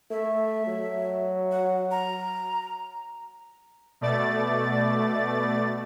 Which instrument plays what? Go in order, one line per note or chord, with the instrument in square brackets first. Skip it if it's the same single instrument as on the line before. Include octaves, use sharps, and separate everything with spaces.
[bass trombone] A3 [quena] E5
[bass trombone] F#3
[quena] F#5
A#5
[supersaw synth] B2 A3 D5 A6